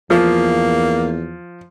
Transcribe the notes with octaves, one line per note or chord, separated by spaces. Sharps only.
E2 F3 A#3